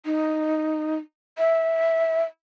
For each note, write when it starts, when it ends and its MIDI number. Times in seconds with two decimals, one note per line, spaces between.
0.05 0.97 63
1.38 2.23 76